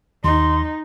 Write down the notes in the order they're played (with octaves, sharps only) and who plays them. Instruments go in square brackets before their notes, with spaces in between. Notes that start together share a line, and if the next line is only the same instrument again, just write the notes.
[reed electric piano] D#2 [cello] D#4 [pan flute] C6